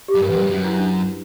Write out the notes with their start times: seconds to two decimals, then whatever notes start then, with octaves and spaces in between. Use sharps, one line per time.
0.08 G4
0.15 F#2
0.22 G2 A#4
0.29 E2 B4
0.35 F#2 A#4
0.43 G2
0.50 F#2 F#4
0.64 E4
0.78 D4